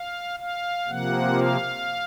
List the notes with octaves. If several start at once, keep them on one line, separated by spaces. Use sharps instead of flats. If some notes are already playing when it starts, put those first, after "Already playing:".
Already playing: F5
F5
C3 F3 A#3 F#5
F5